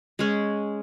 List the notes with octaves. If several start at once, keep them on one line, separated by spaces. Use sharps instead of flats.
G#3 C#4 G#4